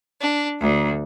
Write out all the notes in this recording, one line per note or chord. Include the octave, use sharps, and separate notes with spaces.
D4
D2